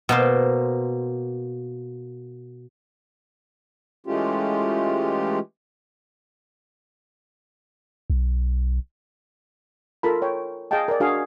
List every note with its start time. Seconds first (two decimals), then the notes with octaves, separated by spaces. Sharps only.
0.09 B2 A#3 C5
4.07 E3 G#3 A3 C#4 F4 G4
8.10 B1
10.03 F4 A4 A#4 A5 B5
10.22 C#5 G5
10.71 G#4 D#5 F5 G5 A5
10.88 A#4 D5
11.00 D4 F#4 G#4 F5 G#5